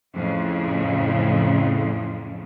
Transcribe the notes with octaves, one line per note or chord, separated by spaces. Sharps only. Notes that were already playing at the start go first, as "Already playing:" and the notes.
F2 A2 C#3